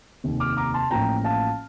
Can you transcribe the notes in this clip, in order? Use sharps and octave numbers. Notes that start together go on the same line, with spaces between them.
F1 D#2 D#3
D6 F6
A#5 D6
A5 C6
A1 A2 F3 A#3 G5 A#5
F5 A5